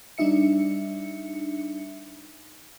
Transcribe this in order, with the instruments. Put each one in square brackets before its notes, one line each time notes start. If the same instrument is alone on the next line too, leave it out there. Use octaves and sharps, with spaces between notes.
[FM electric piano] G3 D4 D#4 E5 C#7